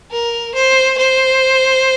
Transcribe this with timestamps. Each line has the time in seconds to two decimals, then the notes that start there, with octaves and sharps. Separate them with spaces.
0.11 A#4
0.55 C5
0.98 C5